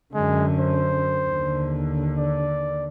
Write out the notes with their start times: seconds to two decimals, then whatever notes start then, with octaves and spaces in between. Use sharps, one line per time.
0.14 F#2 D3 G#3
0.59 C5
1.27 D#2 D3
2.18 D5